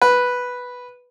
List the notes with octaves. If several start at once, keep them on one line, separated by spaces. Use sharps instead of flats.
B4